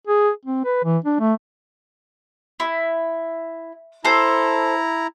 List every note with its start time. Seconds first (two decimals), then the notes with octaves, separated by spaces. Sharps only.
0.07 G#4
0.45 C4
0.65 B4
0.84 E3
1.05 D4
1.20 A3
2.60 E4
4.05 E4 A4 C5 A#5